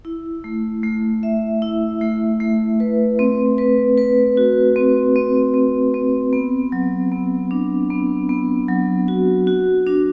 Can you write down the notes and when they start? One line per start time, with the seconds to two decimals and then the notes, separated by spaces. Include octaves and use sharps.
0.05 E4
0.44 A3
0.83 A3
1.23 E5
1.62 E4
2.01 A3
2.40 A3
2.80 B4
3.19 C4
3.58 B4
3.97 B4
4.37 F#4
4.76 C4
5.16 C4
5.54 C4
5.94 C4
6.33 B3
6.72 F#3
7.12 B3
7.51 D4
7.90 B3
8.29 B3
8.68 F#3
9.08 F#4
9.47 F#4
9.86 D4